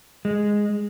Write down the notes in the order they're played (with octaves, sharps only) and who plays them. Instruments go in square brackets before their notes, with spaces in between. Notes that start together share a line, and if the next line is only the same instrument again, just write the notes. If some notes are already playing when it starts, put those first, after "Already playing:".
[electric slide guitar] G#3